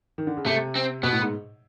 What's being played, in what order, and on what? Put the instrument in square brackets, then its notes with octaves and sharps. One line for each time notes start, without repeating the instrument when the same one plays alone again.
[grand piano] D#3
D3
C#3
[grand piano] C3 [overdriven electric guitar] A3
[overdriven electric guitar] C4
[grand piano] B2 [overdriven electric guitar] B3
[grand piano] A2
G#2